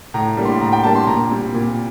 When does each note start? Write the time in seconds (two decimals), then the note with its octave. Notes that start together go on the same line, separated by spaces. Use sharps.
0.14 A2 A#5
0.37 G3 A#3 D4
0.45 C6
0.61 A2 A#5
0.73 G5
0.83 G3 A#3 D4 A5
0.96 C6
1.07 A#2 A#5
1.31 G3 C4
1.54 A#2